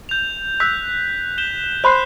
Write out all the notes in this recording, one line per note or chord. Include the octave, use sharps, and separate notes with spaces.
G6 F7
E6 F#6 B6
G6 E7 G7
C5 B5 C6 F#6 C7